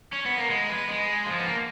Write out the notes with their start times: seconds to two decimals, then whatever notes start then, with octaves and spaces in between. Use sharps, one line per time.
0.13 C#4
0.26 B3
0.37 A#3
0.50 G#3
0.69 B3
0.89 G#3
1.26 F3
1.39 B3
1.45 A#3